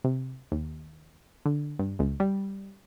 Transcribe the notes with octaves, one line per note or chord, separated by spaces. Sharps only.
C3
D#2
D3
G2
C#2
G3